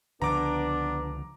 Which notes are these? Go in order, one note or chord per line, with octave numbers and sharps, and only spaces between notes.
C#2 D3 F3 B3 D4 A#5 D6